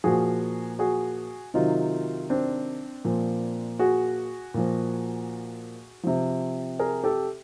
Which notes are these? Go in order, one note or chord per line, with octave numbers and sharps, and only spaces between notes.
A#2 F3 F#4 G#4
F#4 G#4
C3 D#3 F#3 D#4 F4
C4 D4
A#2 F3
F#4 G#4
A#2 F3
C3 F3
G#4 A#4
G4 A4